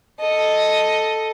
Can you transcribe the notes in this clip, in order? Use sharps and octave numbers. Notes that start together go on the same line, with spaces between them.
A4 D#5